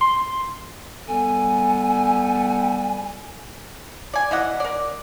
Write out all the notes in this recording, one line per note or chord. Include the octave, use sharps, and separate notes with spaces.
C6
G3 B3 A4 G#5
D5 G#5
E3 D#5 F#5
A#4 D5